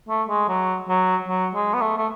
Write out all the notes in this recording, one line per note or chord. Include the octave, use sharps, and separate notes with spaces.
A3
G#3
F#3
F#3
F#3
G#3
B3
A3
A3